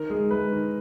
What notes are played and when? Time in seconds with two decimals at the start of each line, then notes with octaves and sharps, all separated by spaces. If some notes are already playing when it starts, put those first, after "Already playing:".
Already playing: D#3 A#4
0.10 G#3 G#4
0.31 G#3 B4
0.52 D#3